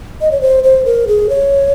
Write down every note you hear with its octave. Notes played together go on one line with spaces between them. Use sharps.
D#5
C#5
C5
C5
A#4
G#4
C#5